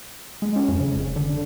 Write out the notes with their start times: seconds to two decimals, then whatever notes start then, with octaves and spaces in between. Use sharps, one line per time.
0.42 G#3
0.56 C#4
0.68 F2
0.80 C#3
0.96 F1
1.16 D3